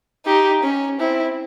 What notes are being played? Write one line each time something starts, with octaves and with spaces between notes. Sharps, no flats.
D#4 G4
C#4
C4 E4